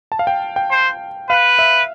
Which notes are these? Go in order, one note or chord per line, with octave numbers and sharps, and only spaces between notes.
A5
F5
G5
G5
C5
B4 F5
E5